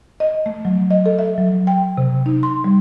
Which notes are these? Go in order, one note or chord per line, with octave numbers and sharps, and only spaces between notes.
D#5
A3
F#3
D#5
A4
E5
F#3
G5
C3
D#4
C6
G3